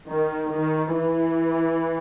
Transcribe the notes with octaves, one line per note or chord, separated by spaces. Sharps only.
D#3
D#3
E3